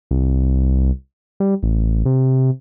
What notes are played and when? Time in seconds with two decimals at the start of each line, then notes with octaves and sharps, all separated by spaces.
0.11 C2
1.40 G3
1.63 A1
2.06 C3